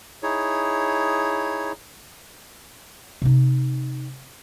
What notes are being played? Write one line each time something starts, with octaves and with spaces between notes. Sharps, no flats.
D#4 E4 G#4 C#5
C3 D#4